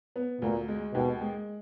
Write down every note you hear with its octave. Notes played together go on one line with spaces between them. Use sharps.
B3
D2 A#2
G#3
D#2 B2
G#3